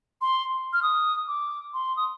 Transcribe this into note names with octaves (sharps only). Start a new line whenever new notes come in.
C6
F6
D#6
D6
C6
D#6